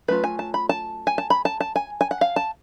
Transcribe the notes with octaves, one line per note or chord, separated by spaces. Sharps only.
F#3 A3 C#4 F4 B4
G#5
A5
B5
A5
G#5
A5
B5
A5
A5
G#5
G#5
F#5
F5
A5